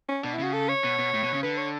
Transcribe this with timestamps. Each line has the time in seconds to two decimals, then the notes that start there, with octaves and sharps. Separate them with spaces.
0.09 C#4
0.24 B2 D4
0.34 E4
0.39 C#3 F#4
0.53 A4
0.69 C#5
0.84 B2
0.99 B2
1.14 A2
1.23 B2
1.34 C#3
1.43 D3 B4
1.58 C#5